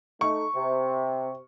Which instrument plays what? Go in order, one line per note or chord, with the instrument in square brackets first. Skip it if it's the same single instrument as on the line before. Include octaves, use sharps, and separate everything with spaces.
[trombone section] A3 D#4 [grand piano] C#6
[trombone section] C3